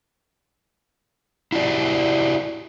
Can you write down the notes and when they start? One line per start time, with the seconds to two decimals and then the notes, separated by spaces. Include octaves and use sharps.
1.52 E4 F#4 G4 D5